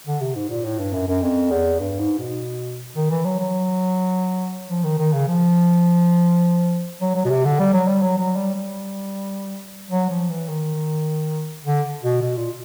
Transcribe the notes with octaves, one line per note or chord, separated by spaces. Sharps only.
D3
C3
G#2
A#2
A2
G2
F#2
F#2
F2
E2
G2
G#2
B2
D#3
E3
F#3
F#3
F3
D#3
D#3
C#3
F3
F#3
F#3
B2
C3
D3
G3
F#3
G3
F#3
F#3
G3
G3
F#3
F3
E3
D#3
D3
B2
B2
A#2